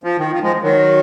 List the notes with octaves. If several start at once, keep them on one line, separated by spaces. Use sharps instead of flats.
F3
D#3
F3
F3 G#3
D#3 F#3